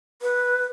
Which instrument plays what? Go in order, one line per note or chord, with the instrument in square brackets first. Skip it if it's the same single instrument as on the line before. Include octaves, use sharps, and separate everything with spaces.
[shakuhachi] B4